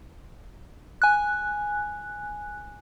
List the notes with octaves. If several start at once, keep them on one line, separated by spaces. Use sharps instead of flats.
G#5 F#6